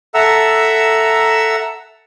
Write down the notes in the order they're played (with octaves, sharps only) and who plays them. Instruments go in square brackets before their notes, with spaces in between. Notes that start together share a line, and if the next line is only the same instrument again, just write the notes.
[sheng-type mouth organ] A4 E5 F#5 A#5 E6